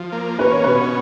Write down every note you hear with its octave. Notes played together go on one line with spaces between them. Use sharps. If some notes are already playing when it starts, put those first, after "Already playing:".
Already playing: F3
A#3
C#4 B4
C#5
B2 B4